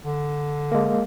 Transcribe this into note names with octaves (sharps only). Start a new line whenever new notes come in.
D3
G#3 A#3